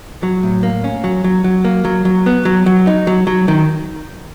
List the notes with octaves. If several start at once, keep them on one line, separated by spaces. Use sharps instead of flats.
F#3
A2
A#3
C#4
F#3
F#3
F#3
A#3
F#3
F#3
B3
F#3
F#3
D#4
F#3
F#3
D#3